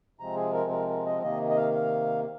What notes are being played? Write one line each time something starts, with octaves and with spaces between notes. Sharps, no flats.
C3 F3 G#3 C4 A#5
G#4
A#4
A#4
A#4
D#5
C3 D#3 A#3 D#5
D#5
F5
F5